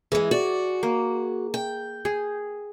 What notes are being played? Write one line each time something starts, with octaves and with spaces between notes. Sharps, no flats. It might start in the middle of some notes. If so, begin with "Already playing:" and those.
E3 G#3 G#4
F#4 D5
A#3
G5
G#4